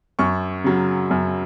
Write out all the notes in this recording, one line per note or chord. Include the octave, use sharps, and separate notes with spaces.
F#2 C#6
C#3 F#3
F#2